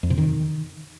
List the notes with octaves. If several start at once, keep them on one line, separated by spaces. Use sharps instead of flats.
F2
C3
D#3